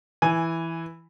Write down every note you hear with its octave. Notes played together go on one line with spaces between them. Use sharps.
E3 G#5